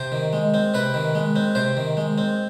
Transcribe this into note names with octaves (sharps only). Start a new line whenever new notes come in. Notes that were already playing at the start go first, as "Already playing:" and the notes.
Already playing: C3 C5
D#3
G#3
C4
C3 B4
D#3
G#3
C4
C3 C5
D#3
G#3
C4